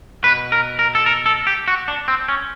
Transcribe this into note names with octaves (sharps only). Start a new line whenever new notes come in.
B2 B4
A#4
A#4
A4
A#4
A4
G4
F#4
D4
C4
C#4